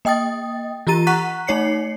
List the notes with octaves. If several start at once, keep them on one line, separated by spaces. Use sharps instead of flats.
A#3 D#5 G5 D#6 A6
E3 F4 G4 A#5 A6 D#7
F#5 A#5 C#6 F#6 B6
A3 D#4 C#5 C7 C#7